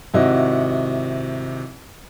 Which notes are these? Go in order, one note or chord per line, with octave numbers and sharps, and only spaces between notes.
G#1 C3 E4 F#4 D#5